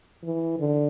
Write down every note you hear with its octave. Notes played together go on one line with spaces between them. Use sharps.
E3
D3